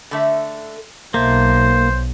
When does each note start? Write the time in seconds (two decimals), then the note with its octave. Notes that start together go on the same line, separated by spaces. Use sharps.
0.11 D3 A3 E5
1.14 B1 A3 A#3 C5